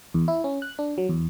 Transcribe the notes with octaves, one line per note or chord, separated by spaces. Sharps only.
E2
E4
C#4
F#6
D4
F#3
E2